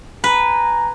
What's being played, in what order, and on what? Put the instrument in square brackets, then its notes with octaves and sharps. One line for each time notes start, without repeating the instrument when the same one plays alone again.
[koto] B4 [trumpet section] G#5 A#5